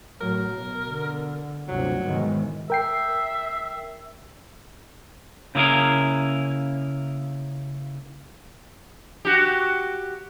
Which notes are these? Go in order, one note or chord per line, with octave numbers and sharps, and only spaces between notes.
A2 F#3 A#4
B2
D3
G1 D2 C3 F#3
G#2 B2 D#3 E3 G#3
A#4 E5 G5 C7
C#3 A#3 E4 G#4 A#4
F#4 G4